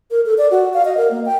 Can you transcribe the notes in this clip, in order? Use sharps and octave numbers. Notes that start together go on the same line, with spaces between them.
A#4
A4
D5
F#4
F5
D#5
A#4
A#3
G5